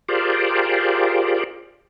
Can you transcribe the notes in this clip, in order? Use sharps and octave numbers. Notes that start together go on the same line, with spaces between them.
F4 G4 G#4 A#4 C5 D5